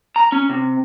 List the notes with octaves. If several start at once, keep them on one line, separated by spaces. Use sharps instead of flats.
A#5
C#4
C3